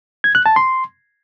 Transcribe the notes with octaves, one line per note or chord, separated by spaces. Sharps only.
G#6
F#6
A5
C6